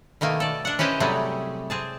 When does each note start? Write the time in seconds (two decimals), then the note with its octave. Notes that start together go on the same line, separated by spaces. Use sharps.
0.21 B2 D#3 A3 A#3 G#5
0.40 A4 D5
0.65 D4 F#5
0.79 C#4 E4 G4 B4 C5 D#5
1.00 C3 F#3 G3 A3 G#4
1.70 C4 G#4 A5